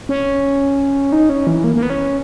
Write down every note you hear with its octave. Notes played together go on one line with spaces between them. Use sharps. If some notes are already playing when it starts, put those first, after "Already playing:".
C#4
D#4
C#4
E3
A#3
A#3
B3
C#4